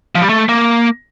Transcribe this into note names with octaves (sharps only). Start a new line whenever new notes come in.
F3
G3
A3
A#3